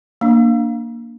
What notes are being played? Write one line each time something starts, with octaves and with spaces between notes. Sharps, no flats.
A#3 D4